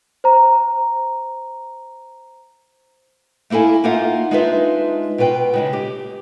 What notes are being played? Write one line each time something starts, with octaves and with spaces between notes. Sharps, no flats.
C5 A#5
A3 A#3 E4 A4 G#5
A#3 D#4 F4 E5 F#5
G#3 D4 D#4 F4 B4 E5
B2 F4 B4 G5
C#3 G#3 D4
G4